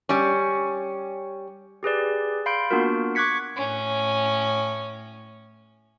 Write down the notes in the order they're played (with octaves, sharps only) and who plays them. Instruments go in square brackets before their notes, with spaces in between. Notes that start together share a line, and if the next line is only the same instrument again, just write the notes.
[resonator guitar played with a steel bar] G3 C#4
[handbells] G4 G#4 B4 D5
F5 B5 C6 G6 D7
A#3 B3 D4 F4 F#4 A#4
C#6 D6 F#6 G#6 B6 C#7
[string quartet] A2 C#4